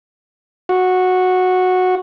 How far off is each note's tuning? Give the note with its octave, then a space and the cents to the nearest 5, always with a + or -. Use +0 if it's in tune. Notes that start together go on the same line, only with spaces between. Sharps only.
F#4 -10